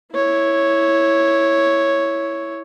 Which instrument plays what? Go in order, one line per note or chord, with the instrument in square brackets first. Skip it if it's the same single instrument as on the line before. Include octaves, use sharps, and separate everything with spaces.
[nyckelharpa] E4 C#5